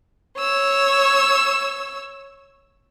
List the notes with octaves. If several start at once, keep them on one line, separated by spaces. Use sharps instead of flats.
C#5 E6